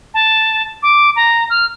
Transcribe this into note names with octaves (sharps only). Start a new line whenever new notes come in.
A5
D6
A#5
F6